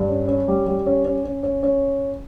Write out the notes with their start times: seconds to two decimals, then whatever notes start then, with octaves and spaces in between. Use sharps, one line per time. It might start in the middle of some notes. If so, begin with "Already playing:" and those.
Already playing: G2
0.09 C#4
0.28 C#4
0.48 G3
0.67 G3
0.86 C#4
1.05 C#4
1.24 C#4
1.43 C#4
1.63 C#4